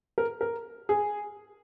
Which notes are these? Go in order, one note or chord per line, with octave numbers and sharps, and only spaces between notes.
A#4
A#4
G#4